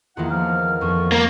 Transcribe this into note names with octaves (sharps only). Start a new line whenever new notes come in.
E2 D#3 A#3 E4 F4 F#5
F3 F6
F2 F3 C#6
A#3 A5 B5 D6